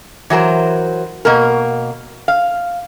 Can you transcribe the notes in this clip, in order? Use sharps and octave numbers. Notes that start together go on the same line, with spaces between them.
E3 F#3 A#4 C5
B2 A#3 A#4
F5